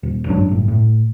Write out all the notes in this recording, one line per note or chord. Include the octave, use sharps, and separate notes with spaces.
D#1
G#1 F#2 F#3 D4
G1 A2
A2